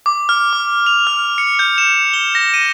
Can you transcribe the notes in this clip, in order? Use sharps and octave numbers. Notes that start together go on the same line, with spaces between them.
D6
F6
D6
F7
F6
C#7
G6
E7
G7
A#6
D#7